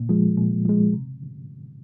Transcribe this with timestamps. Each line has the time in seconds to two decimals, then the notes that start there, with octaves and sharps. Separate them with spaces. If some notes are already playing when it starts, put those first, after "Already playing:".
Already playing: A#2
0.09 F3 G#3
0.37 A#2
0.66 F3 G#3
0.93 C3